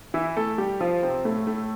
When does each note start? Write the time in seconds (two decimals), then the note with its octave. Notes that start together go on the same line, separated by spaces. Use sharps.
0.14 E3 E4
0.36 A3 A4
0.58 G3 G4
0.81 F3 F4
1.03 C3 C4
1.25 A2 A3
1.47 A2 A3